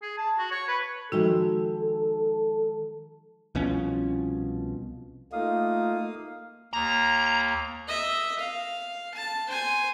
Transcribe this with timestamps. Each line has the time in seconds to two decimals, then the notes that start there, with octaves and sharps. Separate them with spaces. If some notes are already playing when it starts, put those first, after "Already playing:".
0.02 G#4
0.18 A5
0.39 F#4
0.52 C#5
0.68 B4
1.12 D#3 F3 G#3 F#4 A4 E5
3.55 C2 B2 F3 C#4
5.33 A3 A#3 D#4 F4 F5 D#6
6.73 D#2 A#3 A#5
7.88 D#5 E5
8.39 F5
9.14 A5
9.48 C5 G#5